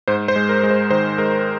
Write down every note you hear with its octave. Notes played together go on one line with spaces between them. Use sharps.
G#2 C5
C5
G#3
A#4
G#3
C5
D#3 C5
G#3 A#4